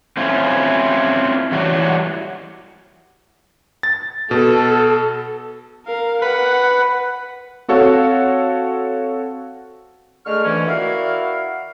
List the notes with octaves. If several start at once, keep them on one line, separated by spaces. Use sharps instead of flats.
C4 C#4 E4 F4
E3 G3 F#4 C#5
A6
B2 A4
A#4 F5
B4 F#5
C4 F#4 A4 C#5 F5 F#5
D3 G#3 A3 C#6 F6
F2 D3 E3 A3 C#4
E4 F#4 A#4 D5 F5